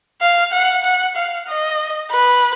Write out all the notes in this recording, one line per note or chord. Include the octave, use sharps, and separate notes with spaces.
F5
F#5
F#5
F5
D#5
B4